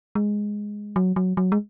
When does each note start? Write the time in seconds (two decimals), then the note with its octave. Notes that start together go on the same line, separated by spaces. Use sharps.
0.15 G#3
0.96 F#3
1.16 F#3
1.37 F#3
1.52 G#3